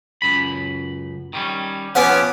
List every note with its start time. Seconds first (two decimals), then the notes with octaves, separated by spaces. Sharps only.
0.22 C#2 F#2 B5
1.33 D#3 G3 C#4
1.95 F3 A#3 B3 C#4 G4 F#5